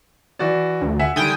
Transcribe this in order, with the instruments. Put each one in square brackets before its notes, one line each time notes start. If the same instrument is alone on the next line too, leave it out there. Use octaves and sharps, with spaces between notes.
[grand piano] E3 F#4 D5
[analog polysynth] D2
[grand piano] E5 F#5 G#5
[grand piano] D3 D#3 G3 [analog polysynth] G5 G#5 D#6